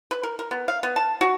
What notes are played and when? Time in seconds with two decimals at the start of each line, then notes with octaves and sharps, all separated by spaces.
0.11 B4
0.23 A#4
0.39 A#4
0.51 B3
0.68 F5
0.83 B3
0.96 A5
1.21 F#4